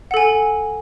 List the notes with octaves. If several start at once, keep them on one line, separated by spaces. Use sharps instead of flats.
A4 F#5 G#5